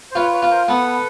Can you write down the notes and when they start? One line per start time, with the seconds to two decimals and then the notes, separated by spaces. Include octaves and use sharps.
0.11 C5
0.15 F4 B4 C#5
0.33 B4 C#5
0.42 F4
0.50 A#4 C5
0.68 B3 A4 B4